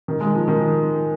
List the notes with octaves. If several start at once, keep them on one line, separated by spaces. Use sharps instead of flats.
D#3
G#3
F3
D#3